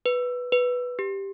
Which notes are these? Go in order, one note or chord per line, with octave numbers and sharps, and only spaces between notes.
B4
B4
G4